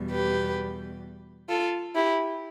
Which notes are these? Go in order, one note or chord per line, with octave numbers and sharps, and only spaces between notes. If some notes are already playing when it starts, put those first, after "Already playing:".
Already playing: E2 B2 G3
G4 B4
F4 A4
E4 G4